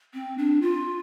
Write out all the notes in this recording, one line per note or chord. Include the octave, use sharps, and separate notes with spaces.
C4
D4
F4